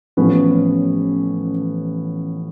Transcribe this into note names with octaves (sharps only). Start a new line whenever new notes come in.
A1 A2 F3 B3 C#4